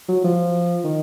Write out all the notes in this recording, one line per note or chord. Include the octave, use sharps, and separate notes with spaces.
F#3
F3
D#3